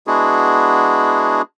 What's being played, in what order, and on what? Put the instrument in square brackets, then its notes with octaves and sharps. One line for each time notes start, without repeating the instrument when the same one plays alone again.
[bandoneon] G#3 B3 D4 E4 F#4 G#4